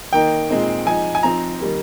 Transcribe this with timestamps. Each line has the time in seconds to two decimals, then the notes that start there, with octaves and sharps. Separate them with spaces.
0.13 D#3 A#3 D#4 G5
0.49 A#2 G#3 C4 D#4
0.86 F3 G#3 D#4 G#5
1.15 G#5
1.23 F3 C4 D#4 A#5
1.60 D#3 G3 A#3